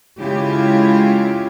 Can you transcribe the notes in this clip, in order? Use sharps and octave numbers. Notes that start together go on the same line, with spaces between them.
C#3 G#3 E4 F4 G4